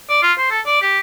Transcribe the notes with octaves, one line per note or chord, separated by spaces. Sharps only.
D5
F4
C5
A4
D5
G4